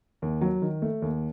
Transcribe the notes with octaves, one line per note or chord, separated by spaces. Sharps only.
D#2
F#3
D#3
A3
D#2